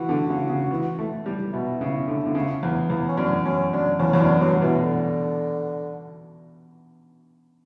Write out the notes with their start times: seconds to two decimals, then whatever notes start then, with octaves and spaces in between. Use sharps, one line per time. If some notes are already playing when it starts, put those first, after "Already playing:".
Already playing: E3 F#4
0.09 D3
0.30 C#3
0.49 C#3
0.71 E3
0.99 A3
1.26 G3
1.53 B2 E4
1.81 C#3
2.07 D3
2.26 D3
2.35 C#3
2.63 E2
2.90 E2
3.08 C#4
3.17 F#2 D4
3.45 F#2 C#4
3.73 F#2 D4
3.99 E2 C#4
4.13 E2 C#4
4.20 F#2 D4
4.41 G2 F#3
4.62 B2 E3
4.82 D3